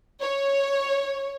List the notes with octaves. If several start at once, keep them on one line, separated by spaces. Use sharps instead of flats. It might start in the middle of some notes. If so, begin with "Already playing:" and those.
C#5